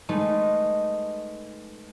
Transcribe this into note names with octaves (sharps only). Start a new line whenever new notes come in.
G#3 A3 D#4 B4